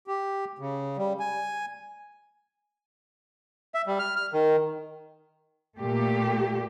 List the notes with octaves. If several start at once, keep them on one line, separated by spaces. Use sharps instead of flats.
G4
C#3
G3
G#5
E5
G3
F6
F6
D#3
A#2 A3 A#3 G4